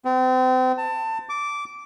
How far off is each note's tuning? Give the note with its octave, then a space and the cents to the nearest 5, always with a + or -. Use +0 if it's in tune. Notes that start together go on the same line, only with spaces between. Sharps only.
C4 -35
A5 +25
D6 -10